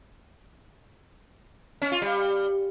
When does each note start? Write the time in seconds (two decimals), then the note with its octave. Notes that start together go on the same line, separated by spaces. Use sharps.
1.82 C#4
1.92 F4
2.02 G3